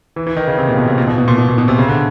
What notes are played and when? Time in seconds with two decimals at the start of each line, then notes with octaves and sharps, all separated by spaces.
0.16 E3
0.27 E3
0.36 D#3
0.47 C#3
0.58 C3
0.67 A#2
0.78 B2
0.87 C3
0.98 A#2
1.07 B2
1.18 B2
1.28 A#2
1.38 B2
1.48 A#2
1.58 B2
1.68 C3
1.78 C#3
1.88 D3